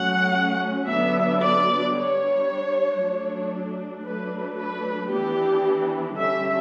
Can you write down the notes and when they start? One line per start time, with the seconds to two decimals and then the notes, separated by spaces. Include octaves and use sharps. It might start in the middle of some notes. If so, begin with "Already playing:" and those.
Already playing: F#3 A3 C#4 F#5
0.88 D3 F#3 B3 D4 E5
1.41 D5
1.93 G3 D4 C#5
3.00 F#3 A3 D4
4.05 F#3 A3 D4 B4
4.58 B4
5.11 E3 B3 D4 G4
6.16 D3 G3 C#4 E5